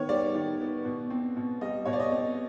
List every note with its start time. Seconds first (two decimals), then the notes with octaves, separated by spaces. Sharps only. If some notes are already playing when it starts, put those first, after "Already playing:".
Already playing: D#3 B3 C#5
0.09 G3 D5
0.35 D#3
0.60 B3
0.85 B2
1.10 C4
1.36 B2
1.61 G3 D#5
1.85 B2 C#5
1.93 D5
2.00 D#5
2.12 C4